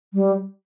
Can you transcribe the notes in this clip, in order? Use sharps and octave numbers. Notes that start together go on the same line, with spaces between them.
G3